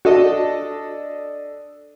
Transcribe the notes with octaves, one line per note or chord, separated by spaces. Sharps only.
D4 F#4 A4 D#5